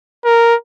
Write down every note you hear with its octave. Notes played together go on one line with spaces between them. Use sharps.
A#4